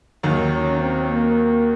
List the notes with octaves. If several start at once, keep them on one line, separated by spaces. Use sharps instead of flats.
D#2 D#3 F#3
C#4
C4
A#3